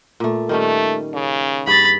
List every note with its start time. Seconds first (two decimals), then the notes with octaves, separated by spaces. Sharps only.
0.20 A#2 A3
0.49 D#3 G3 A3 C#4
1.14 C#3
1.67 G2 G#4 B5 A6